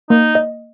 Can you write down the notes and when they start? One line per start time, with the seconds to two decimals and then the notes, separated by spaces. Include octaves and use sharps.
0.10 A#3 D#4
0.35 D#5